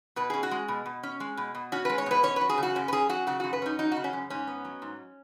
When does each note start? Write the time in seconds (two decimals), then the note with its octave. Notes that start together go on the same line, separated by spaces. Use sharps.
0.16 B2 B4
0.30 C#4 G#4
0.43 F#4
0.51 G#3
0.68 B2
0.86 B2
1.03 C#4
1.20 G#3
1.37 B2
1.55 B2
1.72 C#4 F#4
1.85 G#3 B4
1.98 C#5
2.06 B2 B4
2.23 C#4 C#5
2.36 F#3 B4
2.49 G#4
2.58 C#3 F#4
2.75 F#2 C#4
2.88 B4
2.92 C#4 G#4
3.10 F#3 F#4
3.27 C#3 F#4
3.40 F#2 F#4
3.53 B4
3.62 C#4 D#4
3.79 F#3 D#4
3.92 C#3 F#4
4.04 C#4
4.13 F#2
4.30 G#2 C#4
4.47 B3
4.65 F#3
4.82 G#2